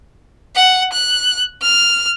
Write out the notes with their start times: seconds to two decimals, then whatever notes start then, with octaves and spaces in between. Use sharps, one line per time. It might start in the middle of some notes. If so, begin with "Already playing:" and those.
0.55 F#5
0.92 F#6
1.62 F6